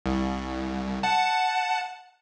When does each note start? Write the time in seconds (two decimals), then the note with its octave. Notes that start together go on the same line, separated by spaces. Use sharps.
0.06 C2
1.03 F#5 A5